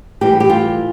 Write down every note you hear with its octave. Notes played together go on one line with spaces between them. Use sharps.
A2 E3 G3 G4
G4
F4